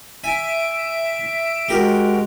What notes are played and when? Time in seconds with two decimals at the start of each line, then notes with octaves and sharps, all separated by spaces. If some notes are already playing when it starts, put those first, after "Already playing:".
0.24 E5 G#5 D7
1.69 G#3 F#4 G4 A#4